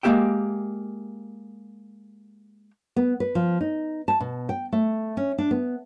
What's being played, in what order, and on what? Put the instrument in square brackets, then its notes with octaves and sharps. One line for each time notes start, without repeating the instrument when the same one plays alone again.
[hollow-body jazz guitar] G#3 A#3 C4 G4 E5 G5
[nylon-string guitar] B3
B4
F3
D#4
A5
B2
G5
A3
C#4
D4
B3